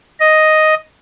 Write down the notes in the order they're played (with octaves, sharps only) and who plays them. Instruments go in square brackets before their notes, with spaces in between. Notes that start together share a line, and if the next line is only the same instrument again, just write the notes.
[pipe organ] D#5